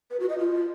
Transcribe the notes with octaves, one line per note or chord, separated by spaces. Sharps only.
B4
F#4
D#5
F4